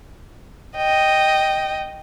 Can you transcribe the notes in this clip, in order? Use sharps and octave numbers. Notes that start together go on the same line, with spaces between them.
D#5 G5